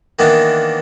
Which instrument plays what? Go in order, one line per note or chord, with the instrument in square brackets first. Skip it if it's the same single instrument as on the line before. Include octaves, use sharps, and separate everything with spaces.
[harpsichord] D#3 E3 A#3 B3 D4